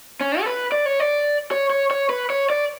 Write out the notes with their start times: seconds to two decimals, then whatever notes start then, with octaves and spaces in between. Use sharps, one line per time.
0.21 C#4
0.41 A4
0.46 B4
0.72 D5
0.86 C#5
1.00 D5
1.51 C#5
1.70 C#5
1.91 C#5
2.10 B4
2.30 C#5
2.50 D5